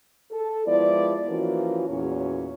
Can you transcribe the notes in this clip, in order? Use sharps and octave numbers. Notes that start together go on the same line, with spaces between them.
A4
F3 G#3 B3 E4 D5
E3 F3 A#3 C#4 F4 F#4
E2 A#2 C#4 F#4 C#5